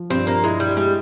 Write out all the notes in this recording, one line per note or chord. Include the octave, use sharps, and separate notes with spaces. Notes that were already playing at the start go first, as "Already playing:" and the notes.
Already playing: F3
G2 C4
A#3
G#3 E4
G3
G3 G#3